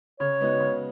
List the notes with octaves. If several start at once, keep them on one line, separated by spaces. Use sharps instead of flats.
C#3 C#5
G#3 B3 D#4 F#4
C#3